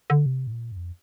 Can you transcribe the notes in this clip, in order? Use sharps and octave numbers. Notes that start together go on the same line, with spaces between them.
D3
C3
A2
A#2
G2
F2